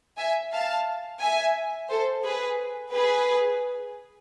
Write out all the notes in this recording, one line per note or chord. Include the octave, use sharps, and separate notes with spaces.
E5 G#5
F5 A5
E5 G#5
A4 C5
G#4 B4
G#4 B4